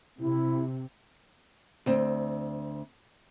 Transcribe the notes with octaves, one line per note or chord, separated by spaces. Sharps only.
C3 E4
D2 C4